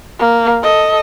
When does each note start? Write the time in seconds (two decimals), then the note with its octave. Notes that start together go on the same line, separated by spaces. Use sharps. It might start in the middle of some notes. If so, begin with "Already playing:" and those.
0.20 A#3
0.63 A4 D#5